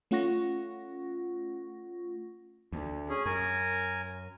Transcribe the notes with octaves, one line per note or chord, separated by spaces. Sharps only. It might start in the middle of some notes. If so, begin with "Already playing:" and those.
A3 C#4 F4 F#5 C#6 A#6
D2
C#4 G#4
F#2 A#4 G#5